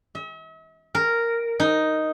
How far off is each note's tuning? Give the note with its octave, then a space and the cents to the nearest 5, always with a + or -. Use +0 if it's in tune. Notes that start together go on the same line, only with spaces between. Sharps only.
E5 -45
A#4 -5
D#4 +0